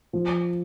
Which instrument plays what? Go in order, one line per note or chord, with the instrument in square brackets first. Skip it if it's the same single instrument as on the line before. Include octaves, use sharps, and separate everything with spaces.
[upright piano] F3